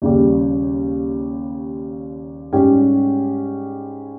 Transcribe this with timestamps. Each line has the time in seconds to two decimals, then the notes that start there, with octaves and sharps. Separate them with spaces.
0.02 D#2 C#3 G3
2.53 G#2 G3 C#4 G4